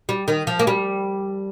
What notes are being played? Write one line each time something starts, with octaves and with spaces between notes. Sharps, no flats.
G3
D#3
F3
A#3
G3